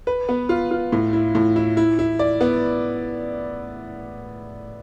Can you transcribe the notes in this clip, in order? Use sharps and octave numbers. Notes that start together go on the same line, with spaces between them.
B4
B3
F4
F4
A2
E4
A2
E4
E4
E4
D5
B3